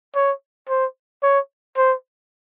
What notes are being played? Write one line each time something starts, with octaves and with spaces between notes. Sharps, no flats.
C#5
C5
C#5
C5